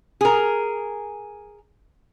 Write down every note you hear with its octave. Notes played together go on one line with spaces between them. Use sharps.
G#4 A#4